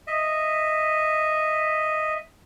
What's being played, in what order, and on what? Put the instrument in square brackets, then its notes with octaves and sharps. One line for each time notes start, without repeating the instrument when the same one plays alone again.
[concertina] D#5 E5